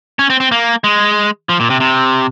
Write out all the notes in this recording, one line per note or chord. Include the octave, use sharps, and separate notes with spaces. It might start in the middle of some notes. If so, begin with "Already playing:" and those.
C#4
C4
C4
A#3
G#3
F3
A#2
C3
C3